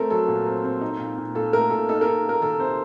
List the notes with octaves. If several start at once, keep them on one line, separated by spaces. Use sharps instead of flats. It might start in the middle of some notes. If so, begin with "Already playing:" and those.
Already playing: A3 C4 A4 A#4
F#3 A4
A#2
C4
C4
D#4
A#2
A#2
A#2 A4
A3 A#4
A#2 A4
D#4 A4
A#4
D#4
A#3
A#4
D#3 A4
C3 C5